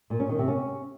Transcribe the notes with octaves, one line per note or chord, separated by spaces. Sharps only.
A#2
C#4
D#3
C3
C#4